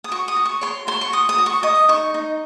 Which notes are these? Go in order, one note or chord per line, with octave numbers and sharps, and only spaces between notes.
D#6
F#4 C#6
D#6
F#4
C#6
C#5 C6
F#4 C6
C#6
F#4 D#6
D#6
F#4
C#6
D#5 D#6
D#4 C#6
D#4